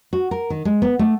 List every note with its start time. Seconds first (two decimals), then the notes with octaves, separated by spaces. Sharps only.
0.13 F#4
0.31 A#4
0.50 D#3
0.65 G#3
0.82 B3
0.99 A3